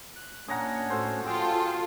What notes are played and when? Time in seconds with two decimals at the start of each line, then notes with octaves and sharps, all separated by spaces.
0.16 F#6
0.48 A#2 C#4 D4 C#5 F#5 A#5 D#6
0.90 A2 F#4 A4 C5
1.26 F4 G#4 A4 G5 E6